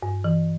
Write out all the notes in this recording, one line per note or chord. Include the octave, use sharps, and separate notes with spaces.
G2
E3